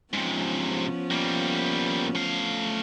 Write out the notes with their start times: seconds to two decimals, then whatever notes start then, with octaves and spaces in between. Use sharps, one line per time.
0.14 G#2 C3 F3 B3 C#4
1.11 G3 A#3
2.15 A3 F5